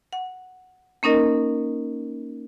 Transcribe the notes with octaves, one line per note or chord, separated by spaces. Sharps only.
F#5
A#3 C#4 D#4 A#4 D#5